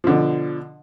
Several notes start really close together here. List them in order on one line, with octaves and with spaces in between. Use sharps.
F3 D3 B2